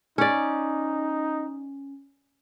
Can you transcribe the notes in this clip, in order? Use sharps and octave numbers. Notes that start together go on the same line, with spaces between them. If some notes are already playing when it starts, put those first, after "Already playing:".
C#4 D#4 D5